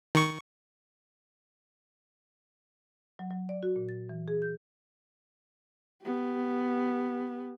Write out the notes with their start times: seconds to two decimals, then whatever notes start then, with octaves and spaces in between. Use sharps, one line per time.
0.15 D#3 C#6
3.19 F#3
3.30 F#3
3.49 D5
3.63 F#4
3.76 A#2
3.89 A6
4.09 E3
4.28 G#4
4.42 G6
6.03 B3 G4